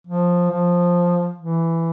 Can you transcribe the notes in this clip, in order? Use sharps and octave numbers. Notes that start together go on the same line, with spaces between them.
F3
F3
E3